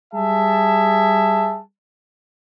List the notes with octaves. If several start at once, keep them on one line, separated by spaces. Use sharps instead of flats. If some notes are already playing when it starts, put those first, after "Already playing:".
G3 G#4 E5 A5